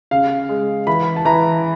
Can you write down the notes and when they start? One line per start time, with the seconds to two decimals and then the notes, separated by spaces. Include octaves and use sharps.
0.11 C#3 F5
0.49 G#3
0.87 E3 B5
1.16 A5
1.25 E3 A#5